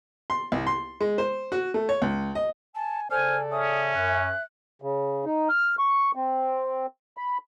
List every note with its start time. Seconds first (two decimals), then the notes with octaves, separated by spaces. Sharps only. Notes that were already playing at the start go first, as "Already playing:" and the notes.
0.30 C6
0.52 C2
0.67 C6
1.01 G#3
1.18 C5
1.52 F#4
1.74 A3
1.89 C#5
2.02 C#2
2.35 D#5
2.75 G#5 A5
3.11 C#3 A4 C5 D5 G#5 F6
3.52 C#4 E5 D#6
3.95 F#2 F#6
4.82 C#3
5.25 D#4
5.49 F6
5.79 C#6
6.15 C4
7.17 B5